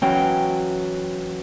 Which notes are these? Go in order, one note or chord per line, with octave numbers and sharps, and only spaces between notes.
E3 F#3 C#4 G5